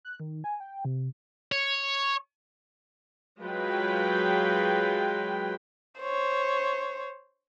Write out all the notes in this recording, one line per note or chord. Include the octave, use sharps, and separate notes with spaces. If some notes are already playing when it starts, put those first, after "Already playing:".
F#6
D#3
G#5
G5
C3
C#5
F#3 G#3 F4 B4 G5
C5 C#5